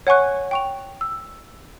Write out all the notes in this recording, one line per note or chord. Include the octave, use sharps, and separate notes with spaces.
C#5 F#5 G#5 C#6 F#6
G5 C#6 F7
E6